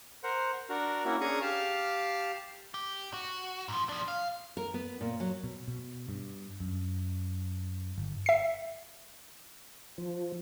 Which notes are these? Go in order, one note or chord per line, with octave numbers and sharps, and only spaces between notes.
A#4 C5 F#5
D4 F#4 A#4
A#3 C#4 E4 F#4
C#4 D4 G#4 A#5 C#6 D#6
G4 F5 A5 F6
G4
F#4
G#2 F3
F3 D4
F5
A#4
B3
A#2
F#3
B2
B2
G2
F#2
G1
E5 C7
F3